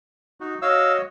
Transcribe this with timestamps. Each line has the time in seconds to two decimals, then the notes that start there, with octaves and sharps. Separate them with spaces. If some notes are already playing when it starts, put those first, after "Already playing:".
0.40 D#4 F#4
0.62 F#4 C#5 D#5 F5 E6